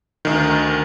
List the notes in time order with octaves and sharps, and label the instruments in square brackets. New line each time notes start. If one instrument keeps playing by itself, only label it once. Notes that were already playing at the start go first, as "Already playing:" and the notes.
[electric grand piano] D2 D#3